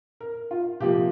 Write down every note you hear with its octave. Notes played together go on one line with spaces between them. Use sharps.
A#4
F4
C3 F3 A#3 G4